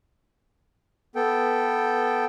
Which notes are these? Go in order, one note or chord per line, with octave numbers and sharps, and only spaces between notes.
B3 A4 G5